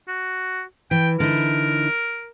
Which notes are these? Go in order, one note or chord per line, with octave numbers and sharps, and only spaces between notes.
F#4
E3 G5
D3 D#4 E4 A#4